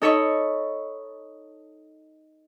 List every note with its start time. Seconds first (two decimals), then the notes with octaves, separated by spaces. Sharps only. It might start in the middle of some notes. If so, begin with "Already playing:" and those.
0.02 D#4 A4 C#5 D#5 B5 C#6